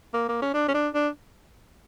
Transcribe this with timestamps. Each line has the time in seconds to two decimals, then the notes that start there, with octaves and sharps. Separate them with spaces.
0.14 A#3
0.29 A#3
0.42 C#4
0.54 D4
0.68 C#4
0.74 D4
0.94 D4